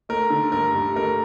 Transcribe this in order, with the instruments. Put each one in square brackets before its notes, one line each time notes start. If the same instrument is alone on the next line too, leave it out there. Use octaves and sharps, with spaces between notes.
[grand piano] A3 A#4
D3
G2 A#4
G2
A3 A#4